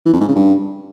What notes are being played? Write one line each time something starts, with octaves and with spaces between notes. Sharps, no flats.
E3
F2
G#2
C#3
G2